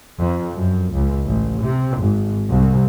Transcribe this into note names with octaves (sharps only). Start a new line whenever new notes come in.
F2
F#2
C#2
A1
C3
G#1
C2